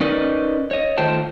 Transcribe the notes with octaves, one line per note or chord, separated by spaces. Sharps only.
C#4 D#4 A#4 B4 D5 D#5
C#5 D#5
D#3 A3 F4 C5 G5 A5